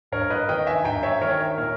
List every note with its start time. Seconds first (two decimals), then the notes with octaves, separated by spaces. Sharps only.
0.12 G2 A#4 C#5
0.30 B4 D#5
0.48 D#3 D#5 G5
0.67 E5 G#5
0.84 G2 G5 A#5
1.03 C#5 E5
1.21 D#3 A#4 C#5
1.58 A#2 A#4